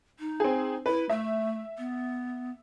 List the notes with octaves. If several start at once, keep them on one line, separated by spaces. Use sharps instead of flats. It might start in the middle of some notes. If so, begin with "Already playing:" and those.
D#4
C4 G#4
E4 B4
A3 E5
B3